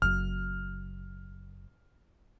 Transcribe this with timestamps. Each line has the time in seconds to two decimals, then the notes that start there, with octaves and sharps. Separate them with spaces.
0.02 F#1 F#2 F6